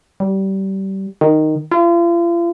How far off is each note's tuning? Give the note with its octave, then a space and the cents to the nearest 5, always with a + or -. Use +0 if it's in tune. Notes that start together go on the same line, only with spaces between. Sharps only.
G3 -25
D#3 -5
F4 -40